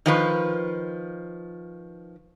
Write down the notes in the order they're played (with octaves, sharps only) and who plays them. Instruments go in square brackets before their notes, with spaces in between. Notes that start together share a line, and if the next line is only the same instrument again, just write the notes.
[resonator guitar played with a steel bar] D#3 F3 B4